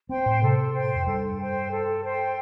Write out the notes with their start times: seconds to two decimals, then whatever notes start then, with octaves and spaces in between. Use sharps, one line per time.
0.09 C4 C5 G5 C6
0.26 A2
0.42 C3 A4
0.74 C5 G5 C6
0.95 F2
1.06 G2 A4
1.39 C5 G5 C6
1.71 A4
2.04 C5 G5 C6